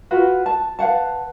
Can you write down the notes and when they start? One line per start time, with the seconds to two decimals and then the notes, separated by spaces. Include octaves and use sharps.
0.11 F4 F#4 B4
0.46 A5
0.79 B4 F5 F#5 A5